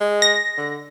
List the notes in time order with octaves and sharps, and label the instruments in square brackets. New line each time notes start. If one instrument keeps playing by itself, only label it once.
[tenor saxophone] G#3
[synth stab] A#6
[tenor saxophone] D3